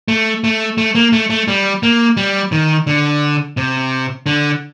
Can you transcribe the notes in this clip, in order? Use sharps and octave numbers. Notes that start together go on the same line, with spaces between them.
A3
A3
A3
A#3
A3
A3
G3
A#3
G3
D#3
D3
C3
D3